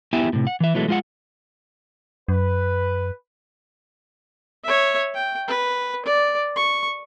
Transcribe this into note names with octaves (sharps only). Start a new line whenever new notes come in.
B3 E4 G4 E5 G5 G#5
A2 C3
F#5
E3 E5
B2 E3 F#3 G#3 A3
G#3 F4 F#5
F#2 B4
C#5 E5
G5
B4
D5
C#6